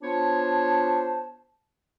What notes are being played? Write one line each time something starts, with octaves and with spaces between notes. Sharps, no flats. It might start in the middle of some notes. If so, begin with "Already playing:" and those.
B3 D4 F4 C5 C#5 A5